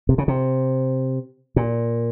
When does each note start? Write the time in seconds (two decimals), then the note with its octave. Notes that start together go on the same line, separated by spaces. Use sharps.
0.09 C3
0.18 C#3
0.28 C3
1.56 A#2